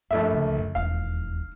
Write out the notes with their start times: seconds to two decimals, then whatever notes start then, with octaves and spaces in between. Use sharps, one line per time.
0.11 A#1 G2 A3 E5
0.30 C#2 D3
0.58 F#2
0.75 E1 D#2 F5